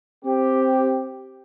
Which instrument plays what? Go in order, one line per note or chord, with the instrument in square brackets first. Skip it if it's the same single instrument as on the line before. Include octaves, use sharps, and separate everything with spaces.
[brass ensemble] C4 G4